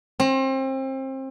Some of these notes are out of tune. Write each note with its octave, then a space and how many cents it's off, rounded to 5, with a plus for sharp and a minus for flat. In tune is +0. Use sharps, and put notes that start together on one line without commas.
C4 +30